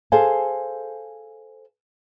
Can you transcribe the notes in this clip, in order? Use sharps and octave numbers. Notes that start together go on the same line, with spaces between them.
G#4 A4 C5 F5 G#5 A5